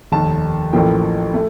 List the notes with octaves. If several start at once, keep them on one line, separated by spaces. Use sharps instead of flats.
F1 D#2 D#3 A5
A1 A2 F3 A#3 G5
A3